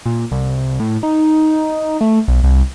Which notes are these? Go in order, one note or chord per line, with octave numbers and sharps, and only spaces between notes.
A#2
C2
A2
D#4
A3
B1
C2